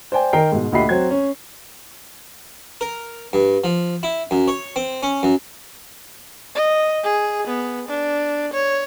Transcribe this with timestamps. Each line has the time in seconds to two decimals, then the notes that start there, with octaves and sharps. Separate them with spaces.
0.12 C5 D5 G5 G#5
0.33 D#3 A#4 D#5 G5 C7
0.52 G#2 B2
0.72 D2 A#2 G4 D#5 B5 C7
0.89 F#3 C4 G#6
1.11 C#4
2.81 A#4
3.33 G2
3.64 F3
4.03 E4
4.31 F#2
4.48 C#5
4.76 C4
5.03 C#4
5.23 F#2
6.55 D#5
7.03 G#4
7.47 B3
7.88 D4
8.53 C#5